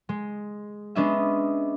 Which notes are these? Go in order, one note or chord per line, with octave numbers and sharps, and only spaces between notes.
G#3
G#3 B3 C#4 D4 D#5 E5